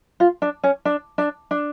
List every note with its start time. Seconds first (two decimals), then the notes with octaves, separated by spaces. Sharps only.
0.20 F4
0.42 D4
0.64 C#4
0.85 D4
1.18 D4
1.51 D4